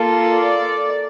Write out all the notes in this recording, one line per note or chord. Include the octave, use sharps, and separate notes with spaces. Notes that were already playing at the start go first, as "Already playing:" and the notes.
Already playing: A#3 F4 A4
D5